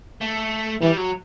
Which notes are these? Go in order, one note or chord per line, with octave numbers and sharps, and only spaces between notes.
A3
E3 G3
F#3